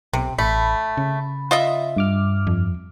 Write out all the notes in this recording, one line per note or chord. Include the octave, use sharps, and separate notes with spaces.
B1 C3
A1 A3 B5
C#3
F4 D#5 E5
G2 D6 F6
F2